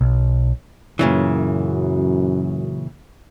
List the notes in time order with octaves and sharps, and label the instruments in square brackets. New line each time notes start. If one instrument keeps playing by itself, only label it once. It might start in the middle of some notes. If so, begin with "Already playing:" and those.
[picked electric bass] B1
[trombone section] F#2 [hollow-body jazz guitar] A#2 C#3 E3